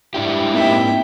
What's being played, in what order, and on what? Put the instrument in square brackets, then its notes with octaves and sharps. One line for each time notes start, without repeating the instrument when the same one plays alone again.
[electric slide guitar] G#2 D4 G4 [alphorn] E4
[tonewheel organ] A#3 C4 D#4 [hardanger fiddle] E5 G5